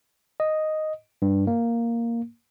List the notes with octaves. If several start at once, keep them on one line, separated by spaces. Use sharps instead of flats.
D#5
G2
A#3